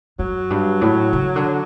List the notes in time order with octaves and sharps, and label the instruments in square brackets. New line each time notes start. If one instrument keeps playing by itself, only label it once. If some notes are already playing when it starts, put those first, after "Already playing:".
[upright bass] F#2 [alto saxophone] F#3
[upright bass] G2
A2
C#3
D3